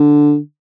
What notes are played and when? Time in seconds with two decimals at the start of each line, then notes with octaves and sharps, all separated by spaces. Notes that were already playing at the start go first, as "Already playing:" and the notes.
Already playing: D3